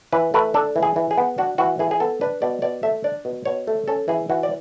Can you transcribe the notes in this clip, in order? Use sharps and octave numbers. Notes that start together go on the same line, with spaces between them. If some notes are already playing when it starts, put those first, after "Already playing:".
E3 B4
A3 B4
D4 A4
E3
G#4
E3
G#4
B3
D4 F#4
E3 F#4
E3 G#4
G#4
B3 A4
D4 B4
B2 D5
B2 D5
A3 E5
D4 D5
B2
B2 C#5
A3
C#4 A4
E3 G#4
E3 F#4
D5